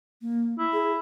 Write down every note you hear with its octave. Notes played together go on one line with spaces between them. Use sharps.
A#3
E4
G#4